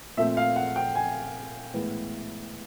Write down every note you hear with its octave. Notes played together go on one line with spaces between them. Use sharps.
A#2 F3 A3 C4 E5
F5
F#5
G5
G#5
A2 E3 G#3 B3